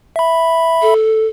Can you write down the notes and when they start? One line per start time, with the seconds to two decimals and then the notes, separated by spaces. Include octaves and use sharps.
0.16 E5 B5
0.82 A4